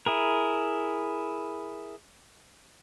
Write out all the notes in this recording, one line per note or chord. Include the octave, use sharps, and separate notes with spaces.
E4 G#4 A#4